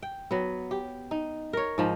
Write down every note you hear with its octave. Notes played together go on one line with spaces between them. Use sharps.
G5
F#3 B3
G4
D#4
A#4 C#5
G#2 F3 D#4